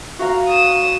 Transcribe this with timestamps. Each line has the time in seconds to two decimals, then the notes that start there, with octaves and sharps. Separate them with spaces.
0.19 F#4 F5 A#5
0.48 D#6 E7